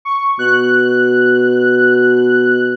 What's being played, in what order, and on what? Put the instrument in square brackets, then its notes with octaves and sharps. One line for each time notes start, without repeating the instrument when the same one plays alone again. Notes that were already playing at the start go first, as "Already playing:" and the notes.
[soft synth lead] C#6
[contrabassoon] B2 [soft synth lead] F#6